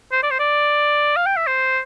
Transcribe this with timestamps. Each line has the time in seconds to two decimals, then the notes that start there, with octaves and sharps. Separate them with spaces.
0.12 C5
0.23 D5
0.31 C5
0.40 D5
1.17 F5
1.26 G5
1.37 E5
1.47 C5